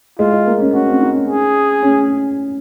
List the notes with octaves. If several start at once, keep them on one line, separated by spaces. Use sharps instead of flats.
G#3 F4
G#3
A#3
C#4
C#4 F#4
C4
D#4
C#4
G#4
C#4